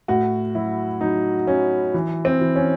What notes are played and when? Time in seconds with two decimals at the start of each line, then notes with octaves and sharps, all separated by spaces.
0.08 A2 F#4
0.55 F#3 E4
1.01 F#3 D#4
1.47 F#3 C#4
1.94 E3
2.25 C4
2.41 E3
2.56 C#4